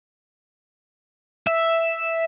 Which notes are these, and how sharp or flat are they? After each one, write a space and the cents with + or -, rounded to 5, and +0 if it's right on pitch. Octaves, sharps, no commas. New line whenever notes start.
E5 +0